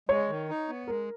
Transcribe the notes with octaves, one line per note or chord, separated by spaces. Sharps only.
G#3 C#5
D#3
D#4
B3
G#3 A#4